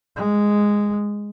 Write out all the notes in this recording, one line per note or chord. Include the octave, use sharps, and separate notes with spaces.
G#3